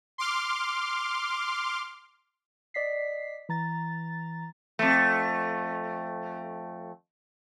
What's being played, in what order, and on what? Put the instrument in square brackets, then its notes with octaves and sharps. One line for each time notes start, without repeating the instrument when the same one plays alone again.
[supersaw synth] C6 D6 F6
[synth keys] D5 D#5 B6 C7
E3 A#5 A6
[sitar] F2 A3